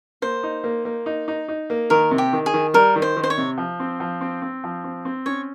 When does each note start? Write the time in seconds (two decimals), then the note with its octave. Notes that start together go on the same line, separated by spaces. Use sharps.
0.22 A#3 C5
0.43 D#4
0.64 A#3
0.85 A#3
1.06 D#4
1.28 D#4
1.48 D#4
1.70 A#3
1.90 D#3 A#4
2.11 C3
2.18 G4
2.33 D#3
2.46 G#4
2.54 D#3
2.74 G3 A#4
2.96 D#3
3.02 C5
3.16 D#3
3.24 C5
3.30 C#5
3.38 C3
3.58 F3
3.80 C4
4.00 F3
4.21 C4
4.42 C4
4.64 F3
4.84 C4
5.05 C4
5.26 C#4 C#5